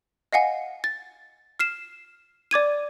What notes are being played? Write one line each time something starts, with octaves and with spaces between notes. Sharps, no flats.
D#5 F5 F#5 G#5
A6
F6 C7 E7
D5 D6 G#6 D#7